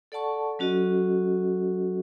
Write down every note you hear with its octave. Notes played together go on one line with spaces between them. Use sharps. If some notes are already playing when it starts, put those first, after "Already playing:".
A4 D5 F#5 A5 C#6
F#3 C#4 F#4 A4 D#5